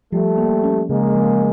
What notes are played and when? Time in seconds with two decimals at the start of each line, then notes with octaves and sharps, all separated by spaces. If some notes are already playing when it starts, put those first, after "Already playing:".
0.13 F3 G3 A3
0.38 A#3
0.63 C#4
0.89 C#3 G#3 A#3
1.15 F3